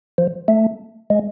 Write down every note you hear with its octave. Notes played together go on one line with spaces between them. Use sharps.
F3
A3
G#3